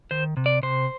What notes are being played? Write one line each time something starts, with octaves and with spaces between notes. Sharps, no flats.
D#3 C5
C3
D5
C3 C5